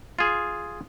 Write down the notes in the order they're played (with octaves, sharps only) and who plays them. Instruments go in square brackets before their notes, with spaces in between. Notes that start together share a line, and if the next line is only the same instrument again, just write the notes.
[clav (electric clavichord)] F4 G#4